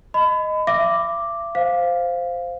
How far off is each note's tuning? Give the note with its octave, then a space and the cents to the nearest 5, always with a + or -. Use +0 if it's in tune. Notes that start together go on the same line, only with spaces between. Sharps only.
D#5 +0 B5 +30
E5 +45 D6 +0
C5 -5 F5 +0